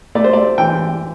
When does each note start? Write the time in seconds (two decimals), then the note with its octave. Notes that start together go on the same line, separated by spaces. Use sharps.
0.15 A3 D5
0.24 C5
0.33 D5
0.58 E3 G5